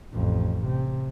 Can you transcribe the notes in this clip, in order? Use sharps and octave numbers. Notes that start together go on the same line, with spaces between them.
A1 F2
C3